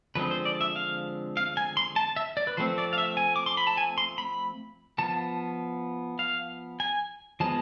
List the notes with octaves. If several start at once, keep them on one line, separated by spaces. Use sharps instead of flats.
D3 F3 G#3 C4 B4
C5
D5
E5
F5
F5
G#5
C6
A5
E5
D5
B4
F3 A3 C4 C5
D5
F5
E5
G#5
D6
C6
B5
A5
G#5
C6
B5
F3 B3 A5
F5
G#5
F3 G#3 B3 A5